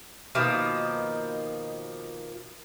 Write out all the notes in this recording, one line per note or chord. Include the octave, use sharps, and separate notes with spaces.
B2 D#3 F3 A#3